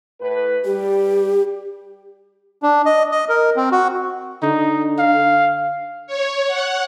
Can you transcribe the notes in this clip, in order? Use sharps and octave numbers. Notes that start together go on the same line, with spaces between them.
A2 B4
G3 G4
D4
D#5
D#5
A#4
C4
F#4
D3 D#4
F5
C#5
F#5